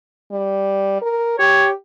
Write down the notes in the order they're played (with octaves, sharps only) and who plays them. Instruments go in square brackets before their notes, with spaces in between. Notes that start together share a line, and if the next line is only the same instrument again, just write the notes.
[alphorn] G3
A#4
[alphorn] G4 [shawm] C#5